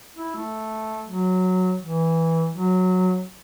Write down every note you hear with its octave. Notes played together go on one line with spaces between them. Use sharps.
E4
A3
F#3
E3
F#3